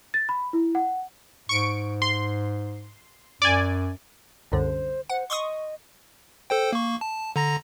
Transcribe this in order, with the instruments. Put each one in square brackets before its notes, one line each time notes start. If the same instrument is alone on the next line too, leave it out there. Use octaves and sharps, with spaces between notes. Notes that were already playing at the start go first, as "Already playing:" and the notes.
[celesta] A6
B5
E4
F#5
[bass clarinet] G#2 [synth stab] C#6 D7
[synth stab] C6
[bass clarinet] F#2 [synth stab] D5 G#5
[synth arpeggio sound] C2 F#2 D3 [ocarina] C5
[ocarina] C5 [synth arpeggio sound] F#5
[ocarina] D#5 [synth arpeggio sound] C6 C#6 D#6
[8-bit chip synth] A4 C5 G5
A#3 C#6
A5
D3 A#5 A#6